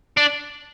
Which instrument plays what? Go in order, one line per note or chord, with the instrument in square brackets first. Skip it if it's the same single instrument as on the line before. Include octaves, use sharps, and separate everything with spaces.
[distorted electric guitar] D4